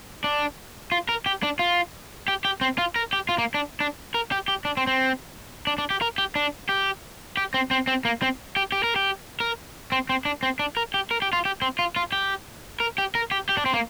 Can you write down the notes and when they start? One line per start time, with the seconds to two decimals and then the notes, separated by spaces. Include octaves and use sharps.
0.24 D4
0.92 F4
1.09 A#4
1.26 G4
1.43 D4
1.59 F4
2.28 G4
2.45 G4
2.61 C4
2.78 F4
2.96 A#4
3.13 G4
3.29 F4
3.38 A#3
3.54 D4
3.80 D4
4.14 A#4
4.32 G4
4.48 G4
4.65 D4
4.77 C4
4.87 C4
5.67 D4
5.78 D4
5.90 G4
6.01 A#4
6.18 G4
6.35 D4
6.69 G4
7.37 G4
7.54 C4
7.71 C4
7.87 C4
8.05 A#3
8.22 C4
8.56 G4
8.72 G4
8.84 A#4
8.96 G4
9.40 A#4
9.92 C4
10.09 C4
10.25 D4
10.43 C4
10.59 D4
10.77 A#4
10.94 G4
11.11 A#4
11.22 G4
11.33 F4
11.45 G4
11.62 C4
11.79 F4
11.96 F4
12.12 G4
12.80 A#4
12.98 G4
13.15 A#4
13.31 G4
13.49 G4
13.57 D4
13.66 C4
13.74 A#3